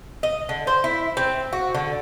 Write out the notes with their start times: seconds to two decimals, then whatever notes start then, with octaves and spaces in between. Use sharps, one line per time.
0.23 D#5
0.49 D3
0.67 C5
0.84 E4
1.17 C4
1.53 F#4
1.75 D3